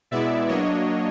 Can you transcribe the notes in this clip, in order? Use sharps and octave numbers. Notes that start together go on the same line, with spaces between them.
B2 G#3 B3 E4 D5 E5
F#3 A#3 D4 C#5 D#5